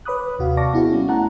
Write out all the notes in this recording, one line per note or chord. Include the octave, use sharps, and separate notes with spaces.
B4 C#5 B5 D6 D#6 F#6
D#2 C3 F#4 F5
D5 F5 A5 C#6 D6 A#6
B3 E4 F#4 G#4
G3 B3 C#4
A3 E4 F#5 A5 A#5 F#6